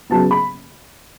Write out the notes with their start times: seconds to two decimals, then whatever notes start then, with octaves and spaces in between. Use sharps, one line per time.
0.10 C#3 F#3 B3 A5
0.31 B5